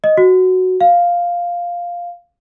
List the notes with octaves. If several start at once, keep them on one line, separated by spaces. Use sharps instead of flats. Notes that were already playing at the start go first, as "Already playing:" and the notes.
D#5
F#4
F5